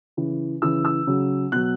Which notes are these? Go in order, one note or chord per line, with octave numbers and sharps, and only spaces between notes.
C#3 E3
C#3 E3 E6
E6
C#3 F#3
B2 F#3 F#6